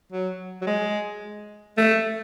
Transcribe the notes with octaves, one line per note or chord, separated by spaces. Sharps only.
F#3
F#3
G#3
A3